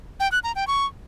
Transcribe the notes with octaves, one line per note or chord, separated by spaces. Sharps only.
G5
F#6
A#5
G5
C#6